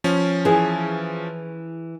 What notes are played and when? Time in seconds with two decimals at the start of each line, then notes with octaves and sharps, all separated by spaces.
0.04 F3 C#4
0.45 E3 G#4